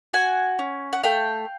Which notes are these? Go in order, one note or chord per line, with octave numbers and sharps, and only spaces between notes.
F#4 F#5 G#5
C#4
F#5
A3 F5 G5